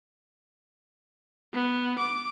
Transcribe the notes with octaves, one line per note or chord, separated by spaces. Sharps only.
B3
D6